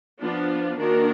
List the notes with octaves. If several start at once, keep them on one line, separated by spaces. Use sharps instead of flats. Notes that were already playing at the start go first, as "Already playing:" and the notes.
F3 B3 D4 F4
D#3 A#3 D4 F#4 A#4